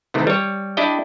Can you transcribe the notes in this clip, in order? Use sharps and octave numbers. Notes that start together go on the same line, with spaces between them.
C3 D#3 E3 A3
G3 C#5
D4 E4 G4 D#5 G5